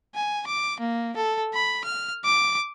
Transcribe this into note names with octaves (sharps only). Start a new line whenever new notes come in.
G#5
D6
A#3
A4
B5
F6
D6